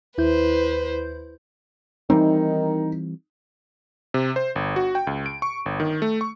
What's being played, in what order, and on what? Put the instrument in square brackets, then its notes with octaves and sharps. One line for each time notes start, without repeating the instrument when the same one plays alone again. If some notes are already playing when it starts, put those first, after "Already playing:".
[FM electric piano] D#2 E4 G6 [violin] B4 C5
[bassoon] D#3 [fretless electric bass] E3 G3 C4 [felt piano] D#4
[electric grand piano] C3
C5
G1
F#4
G5
C#2
D7
C#6
G1
D#3
A3
C#6